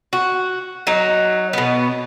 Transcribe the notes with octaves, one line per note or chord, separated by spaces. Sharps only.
F#4
F#3 D#4
B2 B3